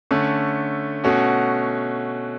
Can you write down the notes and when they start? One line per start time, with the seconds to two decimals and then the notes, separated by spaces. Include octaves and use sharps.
0.11 D3 A3 C#4
1.04 B2 A3 C#4 F#4